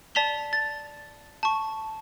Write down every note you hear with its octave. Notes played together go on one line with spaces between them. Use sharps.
D5 A5 B6 F7 G7
A6
A5 C#6